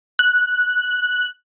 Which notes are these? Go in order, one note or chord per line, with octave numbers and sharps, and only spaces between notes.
F#6